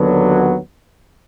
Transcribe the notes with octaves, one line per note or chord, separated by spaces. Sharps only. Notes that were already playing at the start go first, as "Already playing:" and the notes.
Already playing: D#2 D3 F#3 B3